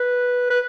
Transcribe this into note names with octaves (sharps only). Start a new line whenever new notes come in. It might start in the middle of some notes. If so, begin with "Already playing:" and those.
Already playing: B4
B4